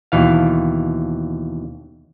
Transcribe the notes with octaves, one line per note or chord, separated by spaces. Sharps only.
D#2 B2 E3 F5